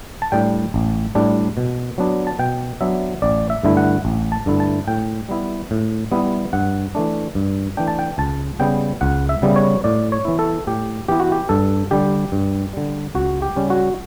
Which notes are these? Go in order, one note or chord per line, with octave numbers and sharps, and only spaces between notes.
A5
A2 G3 D4 G5
A1
A2 G3 D4
B2
F#3 B3 D4
A5
B2 G5
F#3 B3 D4 E5
A1 D5
E5
G2 D3 A3 E4
F#5
A1
A5
G2 D3 A3 E4
A5
A2 G5
G3 B3 E4
A2
G3 B3 E4
G2 F#5
E3 A3 D4
G2
E3 A3 D4 G5
A5
G5
C#2 A5
C#3 G3 B3 G5
C#2 F#5
E5
C#3 G3 B3
C#5
A2 D5
C#5
E3 B3 E4
A4
A2 G4
E3 B3 E4 G4
F#4
G4
G2 A4
D3 G3 G4
G2
D3 G3
C#2 F#4
G4
C#3 G3 C#4
F#4